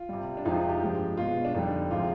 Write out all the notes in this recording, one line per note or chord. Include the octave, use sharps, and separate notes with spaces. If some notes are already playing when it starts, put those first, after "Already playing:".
Already playing: F4
C3 G3
D4
F2 C3 F3 G#3 D#4
F4
D#4
G4
G2 F3 G#3
B2 G#3 F4
D4
F2 D3 G3 D#4
C3 F3 G#3 F4